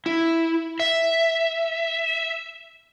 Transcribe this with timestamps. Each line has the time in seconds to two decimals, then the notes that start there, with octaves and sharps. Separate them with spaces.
0.06 E4
0.80 E5